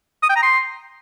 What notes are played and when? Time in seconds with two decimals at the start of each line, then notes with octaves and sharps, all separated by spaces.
0.23 D#6
0.30 G5
0.36 A#5
0.43 C6